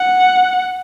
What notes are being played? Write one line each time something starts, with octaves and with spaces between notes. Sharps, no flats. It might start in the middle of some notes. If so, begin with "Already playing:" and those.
Already playing: F#5